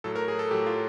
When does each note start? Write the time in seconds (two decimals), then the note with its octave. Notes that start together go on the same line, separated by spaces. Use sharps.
0.04 A2 F#3 A4
0.16 A#4
0.28 G#4
0.39 A4
0.51 A2 F#3 G4
0.66 F4